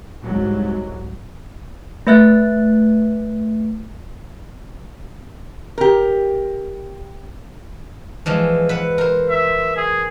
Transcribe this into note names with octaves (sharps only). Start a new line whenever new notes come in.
C2 G#2 F#3
A3 B4 E5 F#6 A6
G4 A#4
E3 F3 G#3
B4 E5 F#5
A#4 C5
E5
G#4